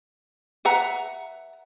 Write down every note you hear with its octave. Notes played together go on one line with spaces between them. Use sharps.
B4 E5 F#5 A#5